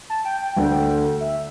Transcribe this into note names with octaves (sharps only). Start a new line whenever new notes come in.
A5
G5
G5
D2 D3 A3
E5